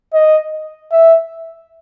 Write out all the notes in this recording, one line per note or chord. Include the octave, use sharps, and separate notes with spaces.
D#5
E5